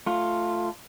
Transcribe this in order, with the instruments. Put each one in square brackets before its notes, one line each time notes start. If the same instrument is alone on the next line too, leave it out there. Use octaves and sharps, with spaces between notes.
[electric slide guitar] A3 F4